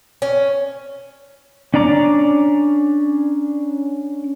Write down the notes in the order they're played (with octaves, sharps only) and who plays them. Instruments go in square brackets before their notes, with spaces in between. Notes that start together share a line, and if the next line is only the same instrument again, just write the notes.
[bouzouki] C#4
[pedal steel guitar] C#4 D4 D5 A#5 D6